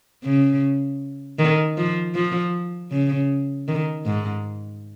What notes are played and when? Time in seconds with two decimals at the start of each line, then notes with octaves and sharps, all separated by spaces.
0.24 C#3
1.39 D#3
1.77 F3
2.15 F3
2.91 C#3
3.68 D#3
4.06 G#2